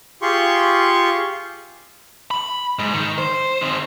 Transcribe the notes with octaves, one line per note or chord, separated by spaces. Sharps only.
F4 G4 G#4 C6 C#6
B5
G#2
D#3
C5
D#3 C4